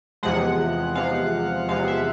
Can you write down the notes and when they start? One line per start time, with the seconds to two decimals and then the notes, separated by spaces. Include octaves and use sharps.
0.23 E2 C3 F3 G#3 F#5
0.95 E2 C3 F3 G#3 F5
1.69 E2 C3 F3 G#3 F5
1.88 E5